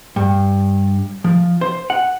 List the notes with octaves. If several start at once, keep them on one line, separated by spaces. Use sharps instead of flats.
G2
F3
C5
F#5